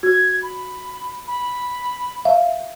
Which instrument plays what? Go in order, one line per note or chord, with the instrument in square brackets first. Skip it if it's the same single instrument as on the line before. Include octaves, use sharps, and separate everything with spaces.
[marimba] F#4 [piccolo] G#6
[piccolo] B5
B5
[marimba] E5 F5